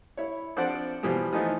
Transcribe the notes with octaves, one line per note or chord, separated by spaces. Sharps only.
E4 C#5
F3 C4 D4 C5 D5 F#5
B2 E3 F3 G3
E3 F3 A3 B3 D#4